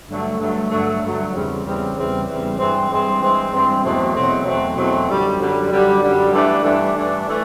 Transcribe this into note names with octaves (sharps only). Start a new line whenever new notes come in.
G2 D3 F#3 A3
G2 D3 F#3 A3
G2 D3 F#3 A3
G2 D3 F#3 A3
E2 C#3 E3 G3 C4
E2 C#3 E3 G3 C4
E2 C#3 E3 G3 C4
E2 C#3 E3 G3 C4
G2 E3 G#3 C4
G2 E3 G#3 C4
G2 E3 G#3 C4
G2 E3 G#3 C4
E2 B2 F#3 A3 C4
E2 B2 F#3 A3 C4
E2 B2 F#3 A3 C4
E2 B2 F#3 A3 C4
F#2 D3 G3
F#2 D3 G3
F#2 D3 G3
F#2 D3 G3
G2 E3 A3 D4
G2 E3 A3 D4
G2 E3 A3 D4
E3 A3